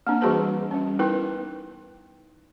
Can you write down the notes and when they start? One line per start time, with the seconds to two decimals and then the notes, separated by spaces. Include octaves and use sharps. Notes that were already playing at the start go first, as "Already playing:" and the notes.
0.07 A#3 C4 D4
0.21 E3 G3 F#4 G#4 B4 A5
0.71 G3 C#4
0.99 B3 D#4 E4 A#4 B4